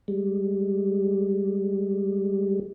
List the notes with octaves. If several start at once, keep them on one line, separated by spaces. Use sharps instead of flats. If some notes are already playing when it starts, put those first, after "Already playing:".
G3 G#3